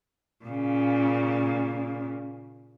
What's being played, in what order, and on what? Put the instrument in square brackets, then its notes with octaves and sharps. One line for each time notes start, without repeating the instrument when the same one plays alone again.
[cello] A#2 C#3